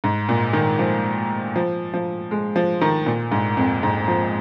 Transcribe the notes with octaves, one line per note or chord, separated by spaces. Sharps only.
G#2
A#2
D#3
F3
F3
F3
G#3
F3
D#3
A#2
G#2
F2
G#2
F3